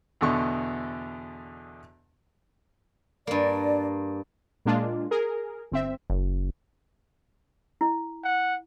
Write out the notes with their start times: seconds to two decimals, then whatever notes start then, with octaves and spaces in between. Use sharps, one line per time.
0.21 E2 B2 D3 C#6
3.27 G2 A#3 D5
4.66 A#2 G#3 A#3 D4 F4
5.11 G#4 A#4
5.72 G1 C4 E5
6.10 F#1
7.81 E4
8.24 F#5